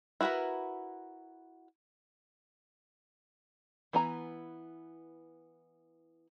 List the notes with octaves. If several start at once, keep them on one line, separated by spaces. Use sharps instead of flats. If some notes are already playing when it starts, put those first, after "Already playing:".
E4 F#4 G#4 A#4 B4
E3 B3 G#5 A#5